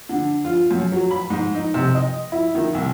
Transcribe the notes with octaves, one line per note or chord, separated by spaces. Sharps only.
D3
F4
F#2
F#3
B5
G#2
D#4
C3
D#5
E4
D#3
C2